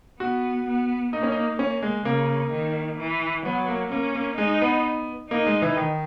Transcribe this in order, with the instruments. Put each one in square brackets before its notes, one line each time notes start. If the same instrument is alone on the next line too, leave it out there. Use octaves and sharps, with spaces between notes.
[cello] B3 [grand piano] F#4
[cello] B3
[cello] A#3 [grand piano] D#4
[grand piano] C#4
D#4
[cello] A#3 [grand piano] C#4
[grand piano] G#3
[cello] C#3 [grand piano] A#3
[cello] D#3
E3
[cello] F#3 [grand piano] B3
[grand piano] A#3
[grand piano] A#3 [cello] C#4
[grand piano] A#3
[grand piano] G#3 [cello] D#4
[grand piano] B3
[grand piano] A#3 [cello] D#4
[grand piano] G#3
E3
D#3